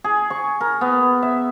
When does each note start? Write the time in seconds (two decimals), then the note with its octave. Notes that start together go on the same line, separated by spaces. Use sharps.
0.04 G#4
0.30 C#6
0.61 A#4
0.81 B3
1.23 E5